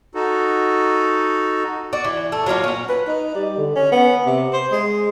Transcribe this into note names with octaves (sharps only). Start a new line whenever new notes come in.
D#4 F#4 A4
F#4 D5
E3
A3
F#3 A#3 D#4 F4
C#4 F#5
B4
D#4
G3
D3
C#4
B3
C3
C5
G#3